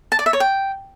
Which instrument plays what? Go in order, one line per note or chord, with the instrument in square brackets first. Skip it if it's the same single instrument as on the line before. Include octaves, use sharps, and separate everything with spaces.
[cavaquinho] A5
D5
E5
C#5
G5